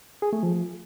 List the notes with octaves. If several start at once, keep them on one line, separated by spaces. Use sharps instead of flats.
G#4
A3
F3